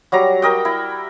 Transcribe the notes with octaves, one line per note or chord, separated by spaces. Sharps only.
F#3 G3 A#5
A#4 D#5 G5
E4